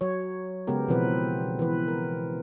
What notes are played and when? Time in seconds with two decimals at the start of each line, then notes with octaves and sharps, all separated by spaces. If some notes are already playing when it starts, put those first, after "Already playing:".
0.01 F#3 C#5
0.67 C#3 G#3 B3 G4 A#4
0.88 B2 E3 F3 C4 B4
1.59 E3 B4
1.88 A#4